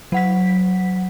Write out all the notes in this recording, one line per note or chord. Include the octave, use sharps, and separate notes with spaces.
F#3 F#5 B6